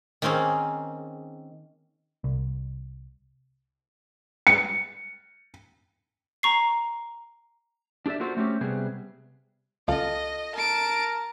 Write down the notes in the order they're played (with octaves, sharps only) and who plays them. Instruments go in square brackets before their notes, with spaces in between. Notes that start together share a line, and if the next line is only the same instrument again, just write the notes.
[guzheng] D#3 A#3 C4 C#4 G#4
[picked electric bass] C2
[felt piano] C#7
[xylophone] A#5 C#6 C7
[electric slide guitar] D4 G4 A4 D5 E5
A#3 D4 F4 F#4 A4 C5
A3 C4 C#4 G4
C3 G3 B3 G#4
[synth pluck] C#2 [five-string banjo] F4 A4 [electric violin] D#5
[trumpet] A#4 [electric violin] A5 D7